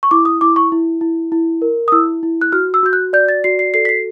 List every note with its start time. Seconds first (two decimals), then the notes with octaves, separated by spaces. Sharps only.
0.03 C#6
0.11 E4 D6
0.25 D#6
0.41 E4 D6
0.56 C#6
0.72 E4
1.01 E4
1.32 E4
1.62 A#4
1.88 D#6
1.92 E4 E6
2.23 E4
2.41 F#6
2.52 F#4 F6
2.74 E6
2.83 F#4 G6
2.93 F#6
3.13 D5 G6
3.29 A6
3.44 F#4 C7
3.59 C7
3.74 A4 C7
3.85 B6
3.89 C7